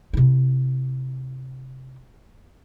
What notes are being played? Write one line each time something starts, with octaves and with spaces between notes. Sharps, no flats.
C3 E4